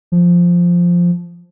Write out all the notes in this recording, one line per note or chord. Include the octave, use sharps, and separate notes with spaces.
F3